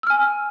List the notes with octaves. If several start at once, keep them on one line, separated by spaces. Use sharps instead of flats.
G#5 E6 F6